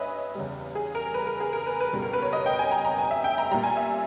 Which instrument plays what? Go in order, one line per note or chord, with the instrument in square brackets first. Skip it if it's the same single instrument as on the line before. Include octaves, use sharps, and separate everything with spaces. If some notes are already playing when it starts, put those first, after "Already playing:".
Already playing: [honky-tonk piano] G2 B4 C#5 D#5 E5 G#5
E2 C#3 G3
G#4
A#4
B4
A#4
G#4
A#4
B4
B4
C#2 B2 G3
A#4
B4
C#5
D#5
G5
G#5
A#5
A#5
G#5
E5
G5
A#5
A#2 G3 A#5
G#5
E5